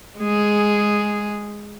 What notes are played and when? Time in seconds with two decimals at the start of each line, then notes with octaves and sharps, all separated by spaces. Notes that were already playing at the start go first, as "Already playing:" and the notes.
0.20 G#3 G#4